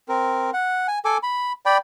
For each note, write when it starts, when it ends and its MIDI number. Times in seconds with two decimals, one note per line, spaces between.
0.09 0.51 60
0.09 0.51 70
0.53 0.87 78
0.88 0.99 80
1.05 1.18 69
1.05 1.18 80
1.05 1.18 86
1.23 1.53 83
1.66 1.78 74
1.66 1.78 79
1.66 1.78 83